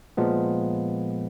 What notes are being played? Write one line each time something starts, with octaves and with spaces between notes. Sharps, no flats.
A#2 F3 G#3 B3